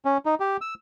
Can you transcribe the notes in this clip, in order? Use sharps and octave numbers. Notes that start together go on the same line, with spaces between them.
C#4
D#4
G4
E6